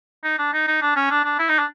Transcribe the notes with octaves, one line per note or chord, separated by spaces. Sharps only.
D#4
D4
D#4
D#4
D4
C#4
D4
D4
E4
D#4
D4